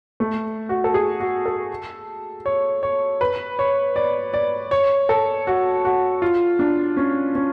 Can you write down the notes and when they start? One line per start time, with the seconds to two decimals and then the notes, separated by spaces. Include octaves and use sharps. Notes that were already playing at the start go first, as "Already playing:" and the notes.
0.20 A3
0.69 F#4
0.84 A4
0.94 G#4
1.20 F#4
1.46 A4
2.46 C#5
2.83 C#5
3.21 B4
3.59 C#5
3.96 D5
4.34 D5
4.71 C#5
5.09 A4
5.47 F#4
5.85 F#4
6.22 F4
6.59 D4
6.97 C#4
7.35 C#4